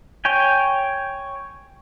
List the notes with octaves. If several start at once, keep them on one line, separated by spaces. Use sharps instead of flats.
C#5 G5 G#5